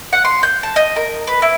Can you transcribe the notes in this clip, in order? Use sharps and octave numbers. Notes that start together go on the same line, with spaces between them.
F#5
C6
G6
A5
D#5
A#4
B4
E4